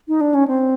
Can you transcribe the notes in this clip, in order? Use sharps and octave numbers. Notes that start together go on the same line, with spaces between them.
D#4
D4
C#4
C4